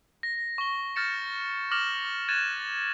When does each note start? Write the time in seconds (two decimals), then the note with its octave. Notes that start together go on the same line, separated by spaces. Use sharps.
0.23 A#6
0.58 C#6 G7
0.96 F6 G6 A6 A#6 C#7 E7
1.71 D6 F6 A#6 E7 F#7 G7
2.28 F#6 G#6 A6 D#7 E7